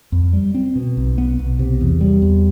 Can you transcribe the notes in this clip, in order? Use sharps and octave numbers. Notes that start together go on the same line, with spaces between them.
F2
G3
C4
B2
B1
B3
B1
C3
E2
G3
E2